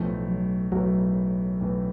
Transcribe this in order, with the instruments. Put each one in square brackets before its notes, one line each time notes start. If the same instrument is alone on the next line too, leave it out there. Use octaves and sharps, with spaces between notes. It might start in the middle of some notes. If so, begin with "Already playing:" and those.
Already playing: [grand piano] B1 A2 E3 A3 [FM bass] F3
[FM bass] F#3
[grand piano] B1 A2 E3 A3 [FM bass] F#3
[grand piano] B1 A2 E3 A3